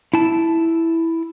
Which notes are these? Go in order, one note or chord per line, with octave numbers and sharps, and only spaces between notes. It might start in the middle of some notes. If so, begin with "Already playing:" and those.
E4 A5